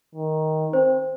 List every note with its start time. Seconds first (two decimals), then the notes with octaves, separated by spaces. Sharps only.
0.15 D#3
0.73 C4 C5